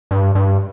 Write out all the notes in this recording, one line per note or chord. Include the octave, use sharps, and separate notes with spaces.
G2
G2